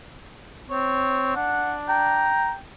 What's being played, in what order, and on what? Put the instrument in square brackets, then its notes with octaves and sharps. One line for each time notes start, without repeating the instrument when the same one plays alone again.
[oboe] C4 [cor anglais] C#5
[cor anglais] D4 [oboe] F#5
[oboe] G5 [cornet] A#5